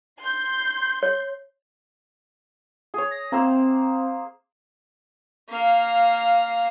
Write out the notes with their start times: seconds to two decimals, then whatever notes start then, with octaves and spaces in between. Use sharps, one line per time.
0.21 C6 G6
1.03 C#5
2.94 G#4 C#5
3.11 A#6
3.32 A#3 C4 C5 E6
5.50 A#3 F5